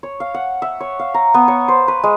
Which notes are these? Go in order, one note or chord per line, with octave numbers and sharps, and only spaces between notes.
C#5
F5
F#5
E5
C#5
F5
A#5
B3
C#5
C5
B4
G#3